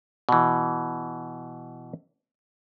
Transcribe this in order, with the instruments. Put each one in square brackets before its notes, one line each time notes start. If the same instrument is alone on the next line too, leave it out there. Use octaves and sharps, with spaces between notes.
[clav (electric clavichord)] B2 E3